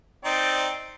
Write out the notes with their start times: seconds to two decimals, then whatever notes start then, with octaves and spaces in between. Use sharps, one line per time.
0.25 C4 D#4 D5